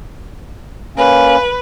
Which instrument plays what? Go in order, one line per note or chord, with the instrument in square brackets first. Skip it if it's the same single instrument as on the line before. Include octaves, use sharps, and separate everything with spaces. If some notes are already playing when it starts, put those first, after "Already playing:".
[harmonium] A#3 C#4 [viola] B4